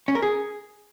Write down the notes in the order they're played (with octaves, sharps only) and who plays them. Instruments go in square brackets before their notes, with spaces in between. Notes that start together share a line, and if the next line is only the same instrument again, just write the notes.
[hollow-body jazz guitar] C#4
A#4
G#4